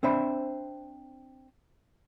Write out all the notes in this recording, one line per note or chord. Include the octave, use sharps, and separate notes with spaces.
C4 D4 C5 E5 B5